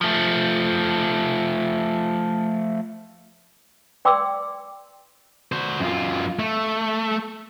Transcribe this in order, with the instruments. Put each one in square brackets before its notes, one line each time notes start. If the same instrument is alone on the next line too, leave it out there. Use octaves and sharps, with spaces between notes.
[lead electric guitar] F3 A3
[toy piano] D5 G5 C6 D6 E6
[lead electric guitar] F#4 C5
F#2 F4
A3